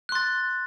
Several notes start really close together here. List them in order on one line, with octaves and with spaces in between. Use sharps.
F#6 C6 A6